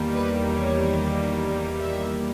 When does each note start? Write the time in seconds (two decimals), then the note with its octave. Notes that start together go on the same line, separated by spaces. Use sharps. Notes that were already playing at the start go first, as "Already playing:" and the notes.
Already playing: E2 D#3 G3 A#3
0.15 B4
0.56 C#5
1.81 E5